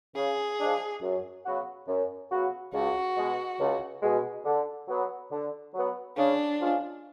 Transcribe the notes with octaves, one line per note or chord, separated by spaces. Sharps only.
C#3 G#4
F3 G#3 D4
F#2
C#3 F#3 B3 F#4
F#2
C#3 F#3 B3 F#4
C#2 F#4
B2 G#3
C#2
B2 G#3
D3
F#3 B3
D3
F#3 B3
C#3 D4
F3 G#3 C#4 F4